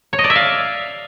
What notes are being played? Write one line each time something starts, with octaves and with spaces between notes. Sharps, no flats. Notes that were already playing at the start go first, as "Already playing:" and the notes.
C#5
D#5
D5
E5
F5